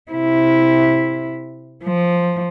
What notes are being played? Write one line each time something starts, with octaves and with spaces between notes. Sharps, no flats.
C3 E4
F3